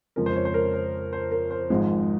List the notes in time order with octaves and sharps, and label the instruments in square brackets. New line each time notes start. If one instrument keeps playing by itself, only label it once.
[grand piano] F2 C#3 F3 G#3 A#4
C5
C#5
C5
A#4
C5
C5
A#4
C5
G#1 G#2 F3 G#3